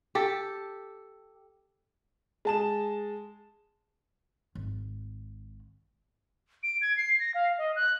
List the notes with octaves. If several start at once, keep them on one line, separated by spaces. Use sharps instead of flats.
G4 A4
G#3 A5 E7
G#1
D7
G#6
C7
A#6
F5
D#5
F#6